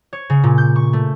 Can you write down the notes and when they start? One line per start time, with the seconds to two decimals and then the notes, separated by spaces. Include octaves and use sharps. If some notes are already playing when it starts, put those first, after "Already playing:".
0.13 C#5
0.30 C#3
0.44 A#2
0.58 G6
0.76 C#6
0.93 A3